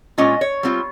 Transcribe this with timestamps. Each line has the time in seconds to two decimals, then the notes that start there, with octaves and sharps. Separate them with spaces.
0.18 A#2 G#3 C#4 F4 D#5
0.41 C#5
0.63 G3 C4 F4